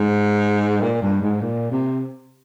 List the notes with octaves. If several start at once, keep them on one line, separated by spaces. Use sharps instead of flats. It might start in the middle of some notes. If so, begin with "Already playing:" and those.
Already playing: G#2
A#2
G2
G#2
A#2
C3